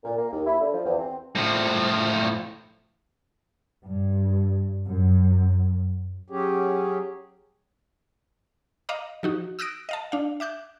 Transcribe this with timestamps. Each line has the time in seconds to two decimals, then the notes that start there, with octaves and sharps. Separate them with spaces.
0.04 A#2
0.16 A#3
0.32 D#2
0.46 E4
0.61 D3
0.73 F3
0.85 E2
0.98 C4
1.35 A2 F3
3.87 G2
4.86 F#2
6.30 F#3 C#4 G4 G#4
8.89 D#5 F5 A#5 D6
9.23 F3 D#4 F#4
9.59 D#6 E6 F#6 A#6 D7
9.89 D#5 F5 A5
10.12 D4 F5
10.40 E5 D6 F#6 G6